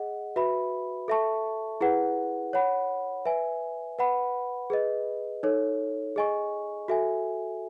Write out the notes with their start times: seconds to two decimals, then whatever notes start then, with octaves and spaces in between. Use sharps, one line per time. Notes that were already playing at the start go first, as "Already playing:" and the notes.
Already playing: G#4 D#5 F#5
0.36 F#4 B4 E5 B5
1.08 A4 E5 A5 C#6
1.81 E4 G#4 B4 F#5
2.53 C#5 F#5 B5
3.25 B4 E5 G#5
3.99 B4 F#5 B5
4.70 G#4 B4 D#5
5.43 D#4 A4 C#5
6.16 G#4 D#5 G#5 C#6
6.88 F#4 A4 E5 G#5